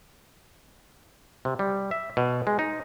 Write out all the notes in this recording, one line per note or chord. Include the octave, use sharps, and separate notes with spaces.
C3
G3
E5
B2
G#3
D#4